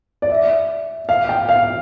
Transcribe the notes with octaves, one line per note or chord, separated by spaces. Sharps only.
D5
E5
F5
G5
F5